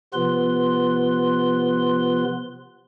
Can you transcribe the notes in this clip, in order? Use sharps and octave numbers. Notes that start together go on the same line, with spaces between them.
C3 F3 B3 F4 B4 C6